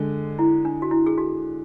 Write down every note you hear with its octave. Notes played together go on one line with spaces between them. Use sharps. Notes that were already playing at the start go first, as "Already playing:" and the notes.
Already playing: D3 G#3
E4
D4
F#4
E4
G#4
F#4